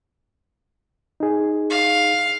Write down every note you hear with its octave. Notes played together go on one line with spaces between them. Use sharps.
D#4 G#4
F5